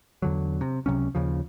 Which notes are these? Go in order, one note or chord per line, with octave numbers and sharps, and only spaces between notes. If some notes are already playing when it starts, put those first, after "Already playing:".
E2 D3 F#3
C3
C#2 C3 F#3 C#4
D#2 C#3 F3